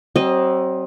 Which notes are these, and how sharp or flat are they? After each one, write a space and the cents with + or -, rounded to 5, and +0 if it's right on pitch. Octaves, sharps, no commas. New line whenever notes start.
F#3 +45 C4 +25 D#5 -5